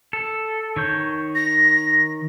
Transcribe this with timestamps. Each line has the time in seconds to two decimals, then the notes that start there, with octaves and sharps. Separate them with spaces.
0.13 A4
0.76 D#3 C#5 G6
1.35 A#6